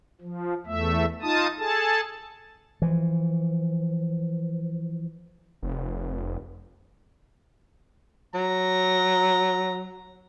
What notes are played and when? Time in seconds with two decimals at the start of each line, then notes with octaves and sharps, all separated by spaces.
0.21 F3
0.66 E2 A3 E5
1.22 D#4 F4 A5 D#6
1.59 G#4 A4 A5
2.82 E3 F3
5.63 F1
8.35 F#3 A#5